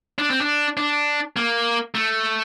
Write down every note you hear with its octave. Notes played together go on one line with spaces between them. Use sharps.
D4
C4
D4
D4
A#3
A3